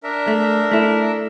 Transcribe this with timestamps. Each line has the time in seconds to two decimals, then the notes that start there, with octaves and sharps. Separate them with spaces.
0.03 D4 A#4 E5
0.27 A3
0.71 A3 E4